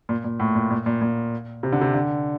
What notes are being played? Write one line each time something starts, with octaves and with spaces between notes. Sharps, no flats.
A#2
A#2
A2
A#2
A#2
A#2
A#2
C3
D3
C3
D3